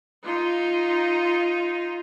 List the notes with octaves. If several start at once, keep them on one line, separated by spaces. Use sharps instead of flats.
D#4 F4